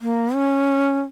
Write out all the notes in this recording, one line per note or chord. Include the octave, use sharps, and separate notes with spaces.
A#3
C#4